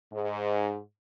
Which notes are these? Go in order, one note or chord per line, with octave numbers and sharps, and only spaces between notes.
G#2